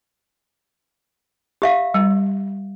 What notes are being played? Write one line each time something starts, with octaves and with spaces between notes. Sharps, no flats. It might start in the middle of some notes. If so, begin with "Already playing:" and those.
G4 E5 F5
G3